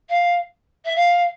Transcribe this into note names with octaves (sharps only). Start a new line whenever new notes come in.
F5
E5
F5